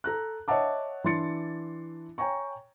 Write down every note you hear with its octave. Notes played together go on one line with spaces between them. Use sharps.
A4 A#5 F#6
C#5 D#5 E5 F#5 A5 D6
E3 D4 C6 A6 C#7
C#5 G5 G#5 A#5 C#6